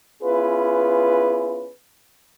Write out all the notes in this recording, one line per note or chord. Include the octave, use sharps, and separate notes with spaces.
B3 C#4 E4 F4 G#4 B4